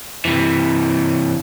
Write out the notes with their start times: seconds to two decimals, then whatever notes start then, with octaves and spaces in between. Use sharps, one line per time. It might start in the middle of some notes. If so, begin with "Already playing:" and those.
0.25 C3 E3